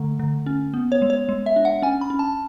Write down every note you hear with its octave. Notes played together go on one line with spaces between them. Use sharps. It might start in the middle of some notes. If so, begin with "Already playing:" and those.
Already playing: D3 A3
D3
C#4
B3
C#5
G#3
C#5
G#3
E5
D4
F#5
C#4 G#5
B5
C#4
A5